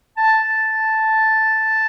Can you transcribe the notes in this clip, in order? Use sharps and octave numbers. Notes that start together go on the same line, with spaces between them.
A5